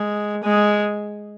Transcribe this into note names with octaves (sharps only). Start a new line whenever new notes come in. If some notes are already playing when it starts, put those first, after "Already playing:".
Already playing: G#3
G#3